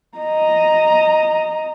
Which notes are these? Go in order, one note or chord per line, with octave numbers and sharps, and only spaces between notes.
D#5 A#5